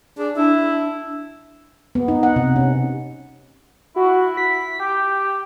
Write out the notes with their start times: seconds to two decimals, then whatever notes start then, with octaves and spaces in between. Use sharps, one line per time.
0.18 D4 G#4
0.36 D4 E4
1.95 B3
2.08 D#4
2.23 F#5
2.36 C3
2.56 C#4
3.96 E4 F#4
4.37 B6
4.80 G4 G5